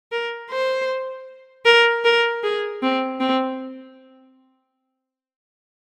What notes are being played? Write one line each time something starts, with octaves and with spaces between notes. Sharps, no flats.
A#4
C5
A#4
A#4
G#4
C4
C4